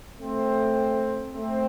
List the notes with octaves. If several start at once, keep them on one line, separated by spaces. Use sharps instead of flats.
A3 C4
A3 C4